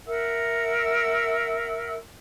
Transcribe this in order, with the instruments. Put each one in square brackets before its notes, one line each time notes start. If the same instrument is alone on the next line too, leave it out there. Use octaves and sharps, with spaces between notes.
[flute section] A#4 E5 F#5 E6